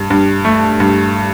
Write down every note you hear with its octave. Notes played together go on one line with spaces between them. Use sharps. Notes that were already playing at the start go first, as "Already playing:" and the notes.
Already playing: G2
G2
A3
G2